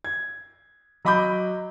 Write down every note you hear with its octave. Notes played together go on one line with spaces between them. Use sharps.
G#6
F#3 D#5 B5 D6 G6